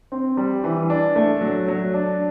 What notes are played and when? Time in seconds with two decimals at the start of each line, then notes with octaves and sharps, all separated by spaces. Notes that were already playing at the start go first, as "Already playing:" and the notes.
0.12 C4
0.37 G3
0.64 E3
0.90 D4
1.16 A3
1.41 F#3
1.68 F#3
1.94 D4